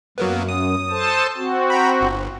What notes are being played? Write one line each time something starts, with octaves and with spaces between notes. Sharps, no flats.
F#2 F#3 A#3 B3
D#6
A4 C5 A5
C4 F#4
G5 A#5 B5
G1